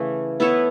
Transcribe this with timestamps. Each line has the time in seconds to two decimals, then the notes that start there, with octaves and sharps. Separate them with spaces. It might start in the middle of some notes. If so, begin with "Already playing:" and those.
Already playing: C#3 E3 A3 E4
0.40 B3 E4 A4 C#5